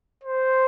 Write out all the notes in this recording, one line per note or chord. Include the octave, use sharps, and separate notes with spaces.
C5